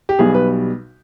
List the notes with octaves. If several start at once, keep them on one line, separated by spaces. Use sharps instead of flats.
G4
B1 B2 G3 G#4
B4